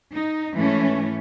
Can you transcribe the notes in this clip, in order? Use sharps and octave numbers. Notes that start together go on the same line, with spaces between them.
D#4
G#2 E3 A3 C#4